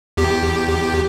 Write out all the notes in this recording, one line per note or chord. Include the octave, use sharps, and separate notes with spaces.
E2 G4